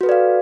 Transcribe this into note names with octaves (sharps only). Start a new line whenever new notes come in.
F#4 A4 B4 D5 F5